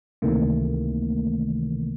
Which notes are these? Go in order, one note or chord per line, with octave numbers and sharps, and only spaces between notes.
C#2 C3 D#3 E3 A3 A#3